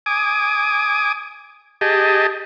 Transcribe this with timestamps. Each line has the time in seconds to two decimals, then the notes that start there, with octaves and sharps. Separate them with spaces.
0.06 G#5 D6 D#6
1.81 G4 G#4 D#5 A5